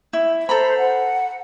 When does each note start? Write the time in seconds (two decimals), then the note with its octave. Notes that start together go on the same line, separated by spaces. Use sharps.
0.13 E4
0.49 A4 C5 A#5 B5
0.78 F#5